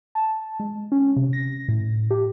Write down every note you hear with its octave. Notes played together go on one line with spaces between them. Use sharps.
A5
G#3
C#4
C3
A#6
A2
G4